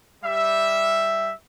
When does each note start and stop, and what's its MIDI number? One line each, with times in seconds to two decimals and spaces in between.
0.24 1.31 55
0.24 1.31 76